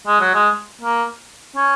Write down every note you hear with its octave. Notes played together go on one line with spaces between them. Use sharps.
G#3
F#3
G#3
A#3
C#4